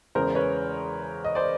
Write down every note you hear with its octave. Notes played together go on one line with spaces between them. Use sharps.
E2 C#3 E3 G#3 A#4 C5
B4 C#5
D#5
C5 D5